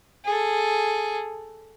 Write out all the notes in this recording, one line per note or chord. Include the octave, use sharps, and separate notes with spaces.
G#4 A4